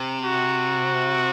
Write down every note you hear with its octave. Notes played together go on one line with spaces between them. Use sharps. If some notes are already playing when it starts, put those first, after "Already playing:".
Already playing: C3
F#4